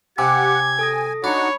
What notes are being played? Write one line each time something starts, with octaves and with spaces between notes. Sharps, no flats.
C3 G4 F#5 G#5 D6 G#6
A4 G#5 D#6 A#6
D4 D#4 F#4 C#5 F#5 B5